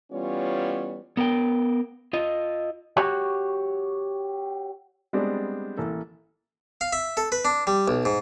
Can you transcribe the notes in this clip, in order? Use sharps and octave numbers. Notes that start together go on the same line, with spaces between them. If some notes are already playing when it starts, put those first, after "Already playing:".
E3 G3 B3 C#4 F4 C#5
B3 A#4 B4 G5
F4 D#5
F#4 G4 C#5 F#5
G3 G#3 B3 C4 D4 D5
A1 A#3 A4
F5
E5
A4
B4
D4
G3
B1
G#2